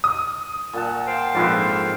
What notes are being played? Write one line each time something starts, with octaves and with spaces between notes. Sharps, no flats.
D#6
A#2 F#5 A5
C5 F5 G5
A#1 F2 G#2 F4 B4 E5